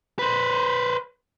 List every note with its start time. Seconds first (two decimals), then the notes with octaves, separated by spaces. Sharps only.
0.19 B4 C5